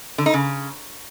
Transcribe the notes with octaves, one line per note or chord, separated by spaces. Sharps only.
D3
D#4
C#3